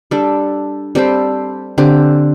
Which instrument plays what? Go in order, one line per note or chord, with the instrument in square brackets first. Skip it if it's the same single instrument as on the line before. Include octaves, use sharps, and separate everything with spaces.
[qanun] G3 D4 A4
G3 C4 A4 C5
D3 C4 G4